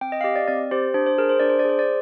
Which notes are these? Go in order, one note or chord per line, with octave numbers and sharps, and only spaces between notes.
C4 G5
D#5
F5
G4 D#5
D5
C4 D5
G4 C5
D4 C5
C5
G#4 A#4
C5
D4 D5
C5
D5
G#4 C5
D5